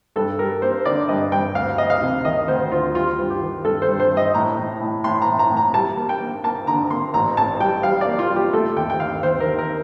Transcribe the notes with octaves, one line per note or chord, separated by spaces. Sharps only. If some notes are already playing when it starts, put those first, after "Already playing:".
G2 A4
G3 A#4
A#3 C5
D3 D5
G2 D#5
G2 G5
D2 F5
D2 D#5
F5
C3
D#3 D#5
D2 C5
D2 F4
G3 F4
G2
G4
D#3
G2 A4
C5
G2
C5
G2
D#5
A2 A#5
A2
A2
A2 C6
A#5
A2
A#5
A2
A#5
G3 A5
A#3
G5
A#3
A#3 A5
D3 A#5
A#3 C6
A1 A#5
A1 A5
G3 G5
G3 F5
D5
A#3
F4
G3
G4
A3 A4
D#2 G5
G5
D#2 F5
D#2 C5
A#4
D#2
A#4